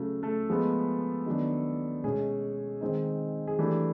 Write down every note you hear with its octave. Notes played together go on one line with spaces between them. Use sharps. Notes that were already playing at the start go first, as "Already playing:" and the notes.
Already playing: C#3 F#3 A3
A3 A4
F3 G#3 B3
D#3 F#3 B3 D4
B2 G#3 C#4 G#4
D#3 G#3 C4 D#4
G#4
E3 G3 A3 D4 G4